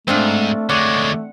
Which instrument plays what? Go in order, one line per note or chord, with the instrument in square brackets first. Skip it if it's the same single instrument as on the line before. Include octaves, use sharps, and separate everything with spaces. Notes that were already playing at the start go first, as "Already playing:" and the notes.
[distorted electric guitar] G#2 [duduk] A3 [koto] C4 D4 F4
[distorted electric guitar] D3 G#3 [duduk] A3 [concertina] C#5 D5 D6 [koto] F#5